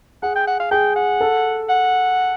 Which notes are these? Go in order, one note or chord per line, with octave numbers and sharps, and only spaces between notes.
G#4 F#5
G5
F#5
F5
G#4 G5
F#5
A4
F#5